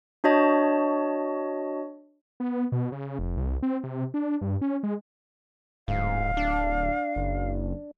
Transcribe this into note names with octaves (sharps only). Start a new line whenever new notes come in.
D4 F#4 C#5 D#5 A5
B3
B2
C#3
F1
C2
C4
C3
D4
G2
C#4
G#3
D1 G#2 F5
D4
F#1